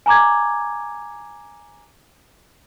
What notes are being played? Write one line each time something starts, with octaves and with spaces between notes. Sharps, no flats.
G#5 A#5 D6 G#6